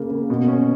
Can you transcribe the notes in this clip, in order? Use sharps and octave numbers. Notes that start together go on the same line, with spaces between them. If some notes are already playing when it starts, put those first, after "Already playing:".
Already playing: C#3 A#3
A#3
B2
C#4